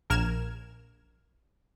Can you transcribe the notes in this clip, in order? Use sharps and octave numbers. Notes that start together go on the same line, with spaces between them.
A#1 A#4 F6 G#6 E7